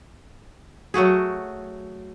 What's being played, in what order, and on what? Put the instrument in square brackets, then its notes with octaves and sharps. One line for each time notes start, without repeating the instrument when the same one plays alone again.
[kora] F#3 A3 F#4 G#4